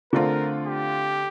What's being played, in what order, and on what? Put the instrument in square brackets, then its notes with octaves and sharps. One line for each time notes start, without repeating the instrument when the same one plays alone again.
[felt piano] D3 A3 C4 F4 [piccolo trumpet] A#4
[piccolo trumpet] G4